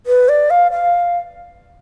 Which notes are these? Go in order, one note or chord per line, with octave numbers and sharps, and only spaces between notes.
B4
D5
F5
F5